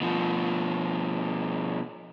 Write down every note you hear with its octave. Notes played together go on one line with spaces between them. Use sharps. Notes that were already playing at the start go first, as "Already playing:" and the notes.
B2 F3